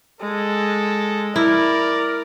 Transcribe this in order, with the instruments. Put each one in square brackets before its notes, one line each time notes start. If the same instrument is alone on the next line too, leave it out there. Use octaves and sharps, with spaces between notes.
[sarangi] G#3 [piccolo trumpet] A4
[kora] E4 [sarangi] A#4 [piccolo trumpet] D5